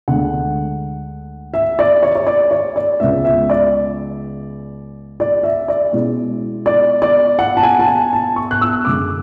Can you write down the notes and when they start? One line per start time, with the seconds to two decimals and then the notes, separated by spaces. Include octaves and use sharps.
0.08 D2 D3 G#3 F#5
1.54 E5
1.79 D5
2.03 C#5
2.15 C#5
2.27 D5
2.51 C#5
2.76 D5
3.00 C#2 C#3 G#3 B3 E5
3.25 E5
3.50 D5
5.20 D5
5.43 E5
5.68 D5
5.92 B2 G#3 C#4 E4
6.66 D5
7.02 D5
7.39 F#5
7.57 A5
7.63 G#5
7.79 A5
7.88 G#5
8.13 A5
8.36 C#6
8.51 F#6
8.61 E6
8.85 F#2 D3 G#3 D6